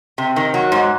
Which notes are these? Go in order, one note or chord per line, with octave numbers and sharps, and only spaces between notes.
C3
D#3
F#3
G#2